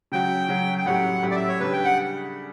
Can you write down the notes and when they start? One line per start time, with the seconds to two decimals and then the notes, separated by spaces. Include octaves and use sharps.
0.12 C#3 F#3 C#4 F#4 G5
0.48 C#3 F#3 C#4 F#4
0.78 G5
0.86 A2 F#3 C#4 G4 F#5
1.23 A2 F#3 C#4 G4
1.31 D5
1.36 E5
1.49 C#5
1.60 C#3 G3 D4 G4 B4
1.73 G5
1.85 F#5